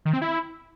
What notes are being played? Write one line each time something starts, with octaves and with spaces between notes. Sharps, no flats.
D#3
C4
E4